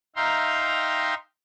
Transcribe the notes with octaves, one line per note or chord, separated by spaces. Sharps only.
D#4 E5 F5 G5 A#5 C6